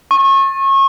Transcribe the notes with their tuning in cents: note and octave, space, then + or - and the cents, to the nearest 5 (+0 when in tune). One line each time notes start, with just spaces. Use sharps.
C#6 -30